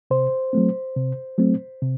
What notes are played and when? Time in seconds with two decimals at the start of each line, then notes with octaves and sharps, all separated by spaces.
0.11 C3 C5
0.53 F#3 A3 C4
0.96 C3
1.38 F#3 A3 C4
1.82 C3